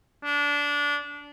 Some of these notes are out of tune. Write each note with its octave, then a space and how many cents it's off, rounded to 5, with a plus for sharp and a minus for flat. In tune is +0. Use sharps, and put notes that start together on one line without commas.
D4 -20